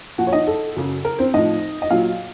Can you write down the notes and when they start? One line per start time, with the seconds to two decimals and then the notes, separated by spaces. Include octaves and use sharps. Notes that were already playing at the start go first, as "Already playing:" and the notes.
0.18 A#2 F3 F#4 F#5
0.27 C#5
0.33 D#4 D#5
0.47 A4
0.76 F#2 C#3 F#3
1.05 A#4
1.19 C4 C5
1.34 A2 F3 D#4 D#5
1.82 D#5
1.90 A#2 F#3 F4 F5